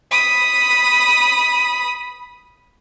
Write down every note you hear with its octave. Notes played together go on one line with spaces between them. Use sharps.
B5 D#6